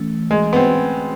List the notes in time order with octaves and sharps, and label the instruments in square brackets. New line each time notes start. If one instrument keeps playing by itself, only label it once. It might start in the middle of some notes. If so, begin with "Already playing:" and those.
Already playing: [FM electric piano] E3 A3 C#4
[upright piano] G#3
B3
C4